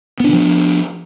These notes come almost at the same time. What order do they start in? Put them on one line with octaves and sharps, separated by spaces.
B3 D4 D3 F3